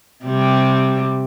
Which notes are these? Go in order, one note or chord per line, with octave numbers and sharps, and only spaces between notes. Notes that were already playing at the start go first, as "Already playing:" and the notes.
C3 G3